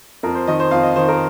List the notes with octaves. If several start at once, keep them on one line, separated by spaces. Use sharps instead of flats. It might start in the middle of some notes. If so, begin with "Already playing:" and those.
F2 A#4
C5
D#3 D#5
C5
F2 F5
D#5
D#3 C5
A#4